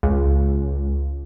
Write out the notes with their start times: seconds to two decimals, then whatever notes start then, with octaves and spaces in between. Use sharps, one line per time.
0.03 C#2